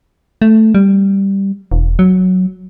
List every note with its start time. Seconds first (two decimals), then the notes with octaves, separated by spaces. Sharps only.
0.42 A3
0.75 G3
1.72 E1
1.99 F#3